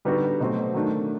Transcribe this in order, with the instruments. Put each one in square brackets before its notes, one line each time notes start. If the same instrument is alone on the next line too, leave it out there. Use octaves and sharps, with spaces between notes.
[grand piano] D3 G3 B3 D#4 F#4
B2 F#3 A3 C4
D#3 F#3 A3 D4